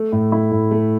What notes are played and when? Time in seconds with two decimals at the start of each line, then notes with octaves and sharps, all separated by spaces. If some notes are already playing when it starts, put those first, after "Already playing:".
Already playing: A3
0.12 A2
0.32 E4
0.51 A2
0.71 A3